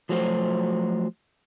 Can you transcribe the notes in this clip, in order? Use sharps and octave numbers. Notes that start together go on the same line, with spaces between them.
F3 F#3 A3 F#4 C5